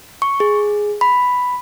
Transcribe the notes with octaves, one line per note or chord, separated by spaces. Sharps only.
C#6
G#4
B5